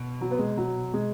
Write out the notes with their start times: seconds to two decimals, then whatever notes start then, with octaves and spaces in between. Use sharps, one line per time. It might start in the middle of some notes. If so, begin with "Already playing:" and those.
Already playing: B2
0.21 F#3
0.31 B3
0.39 G#3
0.57 F#3
0.94 G#3